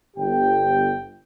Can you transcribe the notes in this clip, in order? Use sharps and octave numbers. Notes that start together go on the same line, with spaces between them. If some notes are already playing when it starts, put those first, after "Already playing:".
G1 G4 G5